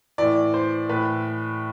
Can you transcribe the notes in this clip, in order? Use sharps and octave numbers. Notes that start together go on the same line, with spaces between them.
A2 E3 D5
C5
A2 E3 B4